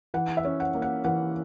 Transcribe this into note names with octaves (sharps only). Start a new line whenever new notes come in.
E3 F#5
E5
C#4
F#5
A#3
F#5
E3 F#5